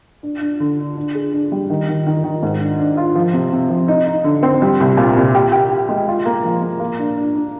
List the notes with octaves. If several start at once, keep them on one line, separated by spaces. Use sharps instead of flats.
D4
D4
D3
D4
D4
G#4
D4
G3
D#3
D#3
D#3
D#3
G#2
D4
D4
F4
F3
C3
C3
F3
D#4
D#4
D3
C4
G3
C2
A#2
C2
G4
G4
G4
G#3
F4
A#3
F3
A#3
A#3
D4
D4
D4